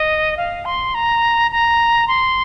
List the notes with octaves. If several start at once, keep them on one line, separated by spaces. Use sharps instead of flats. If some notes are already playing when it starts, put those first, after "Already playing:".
Already playing: D#5
F5
C6
A#5
A#5
C6